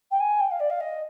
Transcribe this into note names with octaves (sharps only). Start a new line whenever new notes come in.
G5
G#5
G5
F5
D5
F5
D#5